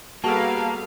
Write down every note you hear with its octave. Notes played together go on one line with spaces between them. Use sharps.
G3 A#3 B3 F#4 G#4 A4 F5 A5